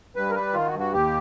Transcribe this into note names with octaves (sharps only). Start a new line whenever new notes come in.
G2 B4
A#4
G3 B4
D#3 F4
F#4
G2
F#4
D#2 G4